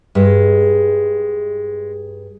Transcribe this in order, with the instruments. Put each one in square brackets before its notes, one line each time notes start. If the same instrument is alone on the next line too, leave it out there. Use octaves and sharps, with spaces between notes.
[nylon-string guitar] G2 [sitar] G#3